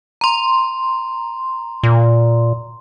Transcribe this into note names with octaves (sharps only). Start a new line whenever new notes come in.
A#5 C6
A#2